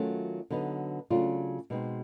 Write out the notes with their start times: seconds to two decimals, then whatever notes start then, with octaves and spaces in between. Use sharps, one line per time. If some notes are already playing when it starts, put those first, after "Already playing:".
Already playing: D#3 F#3 A3 C#4 F4
0.50 D3 F#3 B3 D#4
1.10 C#3 F#3 A3 D4 F4
1.70 B2 G#3 C4 D#4